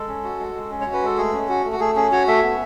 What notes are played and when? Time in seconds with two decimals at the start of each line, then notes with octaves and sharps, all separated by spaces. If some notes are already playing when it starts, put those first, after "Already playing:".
Already playing: G#3 A4
0.08 C#4
0.24 F#4
0.39 G#3
0.55 G#3
0.71 C#4
0.81 C#5
0.86 F#4
0.93 B4
1.02 G#3 A4
1.18 A3 G#4
1.33 C#4
1.49 F#4
1.65 A3
1.72 F#4
1.80 A3 G#4
1.96 C#4 G#4
2.12 F#4 C#5
2.27 A3 E5
2.43 B3